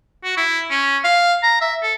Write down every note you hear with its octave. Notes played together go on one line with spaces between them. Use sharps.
F#4
E4
C#4
F5
A#5
E5
A4